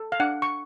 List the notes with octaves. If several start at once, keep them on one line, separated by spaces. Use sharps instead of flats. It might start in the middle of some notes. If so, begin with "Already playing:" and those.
Already playing: A4
F5
D4 F#5
C#6